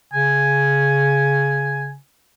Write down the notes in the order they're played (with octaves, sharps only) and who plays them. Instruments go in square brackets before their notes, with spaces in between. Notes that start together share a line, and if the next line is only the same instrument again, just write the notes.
[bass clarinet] C#3 [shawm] G#5